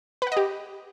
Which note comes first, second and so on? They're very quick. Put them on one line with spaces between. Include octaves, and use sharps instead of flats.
B4 F#5 D#5 G4